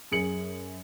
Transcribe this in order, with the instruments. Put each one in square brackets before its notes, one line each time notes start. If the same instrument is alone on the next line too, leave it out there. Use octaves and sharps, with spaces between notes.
[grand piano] F#2 G#4 C#7 F#7